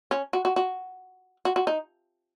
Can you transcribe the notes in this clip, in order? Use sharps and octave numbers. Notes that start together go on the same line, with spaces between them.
C#4
F#4
F#4
F#4
F#4
F#4
D#4